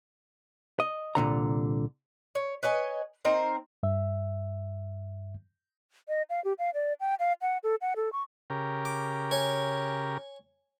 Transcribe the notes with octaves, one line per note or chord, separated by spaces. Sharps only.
D#5
C2 A#2 D3 A#5
C#5
B4 C#5 D#5 G#5
C4 D#4 A#4 C5
G2 E5
D#5
F5
G4
F5
D5
G5
F5
F#5
A4
F#5
A4
C#6
C#3 G4 A#4
D6
C#5 G#5